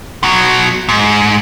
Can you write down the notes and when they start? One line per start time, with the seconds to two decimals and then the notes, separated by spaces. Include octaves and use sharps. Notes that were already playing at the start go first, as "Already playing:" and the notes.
0.23 B2 F#3
0.89 G#2